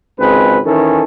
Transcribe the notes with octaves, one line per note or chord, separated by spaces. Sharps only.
G#1 C#2 G#3 C4 B4
D#3 E3 C#4 A4